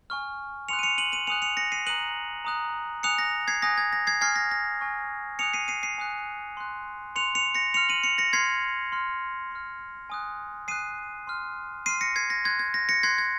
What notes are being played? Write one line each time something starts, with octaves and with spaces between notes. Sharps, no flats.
G#5 C#6 F6
G#5 C6 D#6 F#6 C#7 F7
D#7
C#7 F7
D#7 F#7
D#7 F#7
G#5 C6 D#6 F#6 C#7 F7
C#7 F7
A#6 C#7
C7 D#7
A#5 D#6 F#6 D#7 F#7
A#5 D#6 F#6
G#5 D#6 F#6 C#7 F7
A#6
G#6 C7
G#5 D#6 F#6 A#6
G#6
A#6
G#6 C7
G#5 C#6 F6 G#6 C7
A#6
A#6
G#5 C#6 F6
G#5 D#6 F#6 C#7 F7
C7 D#7
C7 D#7
C7 D#7
G#5 D#6 F#6
C6 F#6
C6 F#6 C#7 F7
C#7 F7
A#6 C#7
C6 F6 C#7 F7
D#7 F#7
C#7 F7
A#6 C#7
C6 F6 G#6 C7
C6 F6
C6 F6
G#5 D#6 F#6
G#5 D#6 F#6 C7 D#7
C6 F6
C6 F6 C7 D#7
A#6 C#7
G#6 C7
A#6
C6 F#6 G#6
G#6
A#6
A#6 C#7
C6 F#6 G#6 C7
G#6